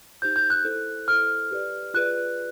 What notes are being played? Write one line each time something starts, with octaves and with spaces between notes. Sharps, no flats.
D#4 G4 C5 G6
G6
F#6
E4 A4 C5
E4 A4 C5 F6
G4 B4 D5
F4 G#4 B4 D5 F#6